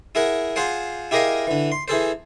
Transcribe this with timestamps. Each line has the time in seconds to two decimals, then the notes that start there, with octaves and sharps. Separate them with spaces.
0.15 E4 G#4 A#4 F#5
0.56 F4 G#4 C5 F#5
1.11 E4 G4 G#4 A#4 D#5 F5
1.47 D3 E3
1.72 C6
1.88 E3 G#4 A4 C5